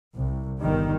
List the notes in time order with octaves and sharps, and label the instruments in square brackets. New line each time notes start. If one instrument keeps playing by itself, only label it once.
[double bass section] C2
G1 D#3 G3